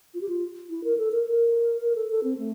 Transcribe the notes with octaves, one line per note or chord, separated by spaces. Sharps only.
F4
G4
F4
E4
A#4
A4
A#4
A#4
A#4
A4
A4
C4
A3